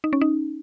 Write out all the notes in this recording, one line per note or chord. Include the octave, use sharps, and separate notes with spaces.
D#4
C#4
D#4